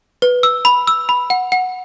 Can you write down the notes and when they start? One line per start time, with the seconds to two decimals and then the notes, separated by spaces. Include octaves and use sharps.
0.22 B4
0.43 E6
0.65 B5
0.87 E6
1.09 B5
1.30 F#5
1.52 F#5